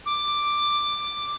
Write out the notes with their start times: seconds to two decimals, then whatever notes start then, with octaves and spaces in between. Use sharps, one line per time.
0.06 D6